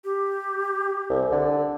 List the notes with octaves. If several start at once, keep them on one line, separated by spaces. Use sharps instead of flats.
G4
C2
D3